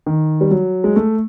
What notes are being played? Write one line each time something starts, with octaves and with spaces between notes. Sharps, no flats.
D#3
G3
F#3
G#3
A3